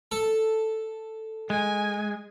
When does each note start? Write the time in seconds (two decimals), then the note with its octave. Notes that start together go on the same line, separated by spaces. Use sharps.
0.11 A4
1.50 G#3 G#5